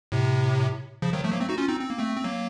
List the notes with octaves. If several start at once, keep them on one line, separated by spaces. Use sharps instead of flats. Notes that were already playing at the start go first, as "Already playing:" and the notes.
A2 C3
C#3 F3
D#3 F#3
F3 A3
F#3 A#3
A3 C4
D#4 F#4
C#4 F4
C4 D#4
C4
A#3
A3 C4
C4
F#3 A#3